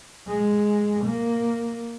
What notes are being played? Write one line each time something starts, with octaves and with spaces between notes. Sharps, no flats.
G#3
A#3